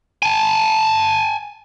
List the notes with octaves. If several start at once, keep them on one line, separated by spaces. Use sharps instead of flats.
G#5 A5